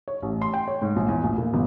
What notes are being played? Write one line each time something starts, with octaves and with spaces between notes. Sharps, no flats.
C#5
A1
C6
G5
C#5
G#2
A#1
E2
A#1
A#2
G1